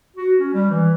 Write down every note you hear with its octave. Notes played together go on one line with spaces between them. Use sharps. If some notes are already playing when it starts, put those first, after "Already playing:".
F#4
C#4
G3
E3